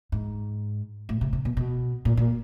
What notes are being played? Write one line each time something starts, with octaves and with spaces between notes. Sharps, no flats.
G#2
A2
C3
C3
B2
B2
A#2
A#2